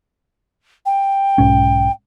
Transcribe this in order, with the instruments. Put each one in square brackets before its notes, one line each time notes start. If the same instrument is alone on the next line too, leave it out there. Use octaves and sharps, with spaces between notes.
[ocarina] G5
[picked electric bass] B1 G#2 C#4